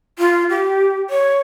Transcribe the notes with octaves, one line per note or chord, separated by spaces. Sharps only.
F4
G4
C#5